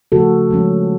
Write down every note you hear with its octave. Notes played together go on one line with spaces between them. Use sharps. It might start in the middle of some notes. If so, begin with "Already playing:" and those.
C#3 F3 A3 F#4 A4
F3 G#3 C#4